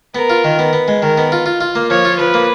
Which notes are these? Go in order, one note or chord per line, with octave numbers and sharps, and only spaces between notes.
B3 A#4
F4
D#3
B3
B3
G#3
D#3 A#4
B3
F4
F4
F4
A#3
F3 C#5
F4
F3 B4
A#3